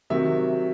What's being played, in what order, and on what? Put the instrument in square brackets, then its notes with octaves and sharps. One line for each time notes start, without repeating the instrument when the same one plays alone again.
[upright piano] C3 D#3 F#3 E5